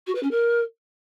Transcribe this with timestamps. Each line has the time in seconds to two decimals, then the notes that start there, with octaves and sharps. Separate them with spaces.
0.07 F#4
0.15 B4
0.23 C#4
0.31 A#4